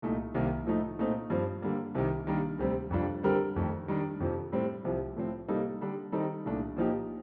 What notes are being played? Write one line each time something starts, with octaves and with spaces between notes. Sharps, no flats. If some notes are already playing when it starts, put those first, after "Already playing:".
C2 A#2 A3 D#4
C2 C3 D#3 A#3
A2 F3 A3 D#4
A#2 A3 C4 D#4
G2 F3 C4
D3 G3 A#3
C2 C3 D#3
D#3 G3 A#3 D4
D2 C3 G3 C4
F2 C3 G3 D4 F4
D3 G3 C4 G4 A#4
F2 D#3 A3
D#3 G3 D4
F2 C3 F3
A2 G3 C4
C2 C3 F3
A2 F3 C4
C3 G3 A#3 D#4 A4
D3 G3 D4
D#3 G3 C4 D#4 A4
C2 A#2 A3 D4
A#2 F3 A#3 D#4 G4